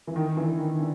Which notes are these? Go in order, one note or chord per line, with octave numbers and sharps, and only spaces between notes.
E3
D#3
D3 E3
D#3
D3